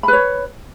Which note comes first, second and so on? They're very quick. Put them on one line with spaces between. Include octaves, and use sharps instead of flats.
B5 B4 C#5